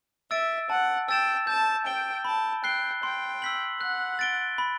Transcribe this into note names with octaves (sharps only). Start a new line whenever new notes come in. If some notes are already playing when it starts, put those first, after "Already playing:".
E5 E6 A6 D7
F#5 A5
G5 E6 A6 E7
A5 G6
G5 D7 G7
A5 B5
G5 F#6 C7 G7
G5 C6
E6 B6 F#7
F#5 F#6
A6 D7 G7
B5